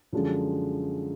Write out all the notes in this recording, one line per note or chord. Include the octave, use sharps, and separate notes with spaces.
F#2 D3 F3 G#3